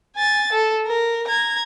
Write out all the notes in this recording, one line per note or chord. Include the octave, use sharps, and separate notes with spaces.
G#5 A6
A4
A#4
A#5 G#6